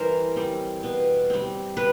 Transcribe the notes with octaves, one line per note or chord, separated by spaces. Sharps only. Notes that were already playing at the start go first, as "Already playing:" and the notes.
Already playing: E3 G3 C4 A#4 C5
G3 C4
B2
G3 C4
B2 B4